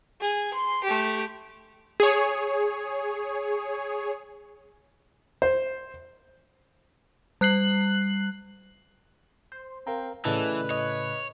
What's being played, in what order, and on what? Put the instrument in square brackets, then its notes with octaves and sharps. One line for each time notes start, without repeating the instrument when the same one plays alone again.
[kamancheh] G#4
C6
A3 G4
[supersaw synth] G#4 C#5
[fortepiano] C5
[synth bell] G3 F#6 C7 F#7
[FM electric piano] C5 [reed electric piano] C6
[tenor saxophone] C4 [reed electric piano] A#4 F5 A#5
[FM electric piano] A2 C#3 A4 [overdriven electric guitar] E3 [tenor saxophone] B4 [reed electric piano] D5 D#5
[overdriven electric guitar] C#5 [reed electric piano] D#5